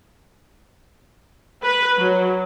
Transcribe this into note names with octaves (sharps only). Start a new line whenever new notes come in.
B4
F#3